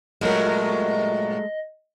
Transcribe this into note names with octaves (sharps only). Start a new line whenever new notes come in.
G2 A#2 F#3 G#3 A3 A#4 D#5